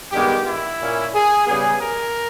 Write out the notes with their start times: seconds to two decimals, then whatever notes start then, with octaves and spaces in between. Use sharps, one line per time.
0.12 G2 D#3 G#3 B3 G4
0.47 E4
0.80 A#2 A#3 C#4
1.14 G#4
1.47 C#3 G3 B3 G#4
1.81 A#4